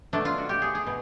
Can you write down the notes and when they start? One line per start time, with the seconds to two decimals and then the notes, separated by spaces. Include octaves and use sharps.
0.13 B2 F#3 A3 D4
0.25 F4
0.38 F#4
0.49 G4
0.62 G#4
0.75 G#4
0.87 B2